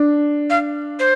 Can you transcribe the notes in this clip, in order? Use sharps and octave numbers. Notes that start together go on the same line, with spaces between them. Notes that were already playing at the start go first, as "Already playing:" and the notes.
Already playing: D4
F5
C5